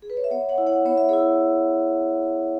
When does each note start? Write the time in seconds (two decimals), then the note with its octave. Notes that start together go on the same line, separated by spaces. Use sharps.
0.02 G#4
0.10 B4
0.17 C#5
0.24 E5
0.30 B3 C#5 F#5
0.49 C#5 F#5
0.58 E4
0.67 C#5 F#5
0.85 B3 C#5
0.98 E5
1.09 E4 G#4 C#5